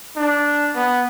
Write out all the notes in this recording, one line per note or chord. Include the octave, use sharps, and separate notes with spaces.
D4
B3